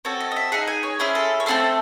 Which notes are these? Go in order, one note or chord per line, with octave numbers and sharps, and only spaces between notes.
C4 F#4 A4 C#5
D#5
D#5
E5
D#4 G#4 F#5
G#5
C#5
C#4 E4 G#4 C5
A4
C#5
A3 C4 E4 A4 C5